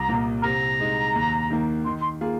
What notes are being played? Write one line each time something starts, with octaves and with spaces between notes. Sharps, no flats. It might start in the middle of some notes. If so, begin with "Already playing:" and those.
Already playing: C2 A#5
A#2 A#3
C3 A#5
G#3 D#4
D#2
D#3 A#3
D#3 C6
C6
A#3 F4 G#4